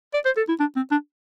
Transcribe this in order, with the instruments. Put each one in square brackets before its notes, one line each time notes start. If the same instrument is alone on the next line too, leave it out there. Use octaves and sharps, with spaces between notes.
[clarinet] D5
C5
A4
E4
D4
C4
D4